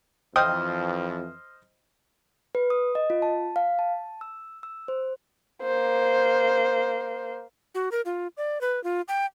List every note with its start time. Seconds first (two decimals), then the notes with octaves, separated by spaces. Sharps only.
0.36 F2 E3 C5 D#5 G5 D#6 F6
2.55 B4
2.70 D#6
2.95 D#5
3.10 F4
3.22 A5
3.56 F5
3.79 A5
4.21 E6
4.63 E6
4.88 C5
5.63 A#3 C5
7.75 F#4
7.92 A#4
8.06 F4
8.37 D5
8.61 B4
8.84 F4
9.08 G5